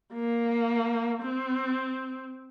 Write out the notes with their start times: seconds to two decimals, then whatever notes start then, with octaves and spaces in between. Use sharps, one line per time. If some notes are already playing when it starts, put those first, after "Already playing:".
0.13 A#3
1.22 C4